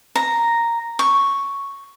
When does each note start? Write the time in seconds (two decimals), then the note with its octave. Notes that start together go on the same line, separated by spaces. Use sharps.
0.15 A#5
0.99 C#6